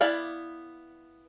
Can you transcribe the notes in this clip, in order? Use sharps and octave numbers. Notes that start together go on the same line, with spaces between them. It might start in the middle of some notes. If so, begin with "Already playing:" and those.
B3 E4 D5 E5 F5